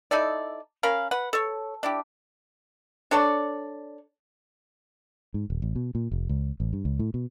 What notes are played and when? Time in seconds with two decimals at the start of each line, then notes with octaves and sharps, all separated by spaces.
0.11 D#4 E4 A4 D5
0.83 C#4 A#4 F5 B5
1.11 B4 F#5
1.33 A4 C#5
1.83 D4 E4 G4
3.11 D4 A4 C#5 D5
5.34 G#2
5.50 D#1
5.62 A1
5.76 B2
5.95 A#2
6.12 F1
6.29 C#2
6.60 A1
6.73 G2
6.85 C#2
6.99 A2
7.14 B2